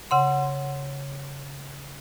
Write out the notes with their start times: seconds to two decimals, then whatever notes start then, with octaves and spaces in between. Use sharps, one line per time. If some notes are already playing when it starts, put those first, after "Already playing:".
0.11 C#3 F#5 C6